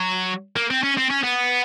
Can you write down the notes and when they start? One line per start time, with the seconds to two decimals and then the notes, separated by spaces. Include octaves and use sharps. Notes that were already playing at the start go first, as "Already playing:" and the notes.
Already playing: F#3
0.56 A#3
0.71 C4
0.83 C#4
0.97 C4
1.10 C#4
1.24 B3